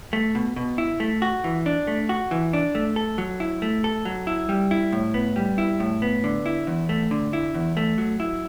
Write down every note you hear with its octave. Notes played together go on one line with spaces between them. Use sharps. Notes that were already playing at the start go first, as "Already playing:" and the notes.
A3
B2
B2
E4
A3
F#4
E3
D4
A3
F#4
E3
D4
A3
A4
F#3
E4
A3
A4
F#3
E4
G3
E4
A2
B3
G3
E4
A2
B3
D3
E4
E2
A3
D3
E4
E2
A3
F#3
E4